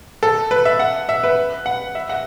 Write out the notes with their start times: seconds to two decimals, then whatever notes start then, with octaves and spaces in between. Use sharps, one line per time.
0.23 A4
0.51 B4
0.65 E5
0.79 F#5
1.09 E5
1.23 B4
1.66 F#5
1.95 E5
2.09 F#5